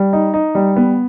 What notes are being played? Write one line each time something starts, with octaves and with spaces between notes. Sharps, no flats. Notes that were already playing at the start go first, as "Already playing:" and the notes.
Already playing: G3
D#4
D#4
G3
B3